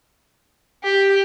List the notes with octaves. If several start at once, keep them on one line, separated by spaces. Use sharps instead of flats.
G4